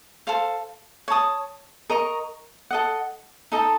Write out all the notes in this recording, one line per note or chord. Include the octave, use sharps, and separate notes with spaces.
A4 C5 F5
C#5 A5 D#6
A#4 D#5 A#5 C#6
A4 D#5 F#5
D#4 A4 D#5 A5